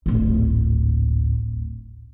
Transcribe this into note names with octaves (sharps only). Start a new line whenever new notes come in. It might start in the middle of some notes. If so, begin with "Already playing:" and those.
D1 G#1